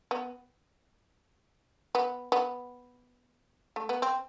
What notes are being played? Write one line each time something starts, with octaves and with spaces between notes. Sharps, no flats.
B3
B3
B3
A3
B3
C4